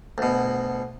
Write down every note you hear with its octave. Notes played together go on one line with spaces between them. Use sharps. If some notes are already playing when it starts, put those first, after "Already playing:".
D2 B2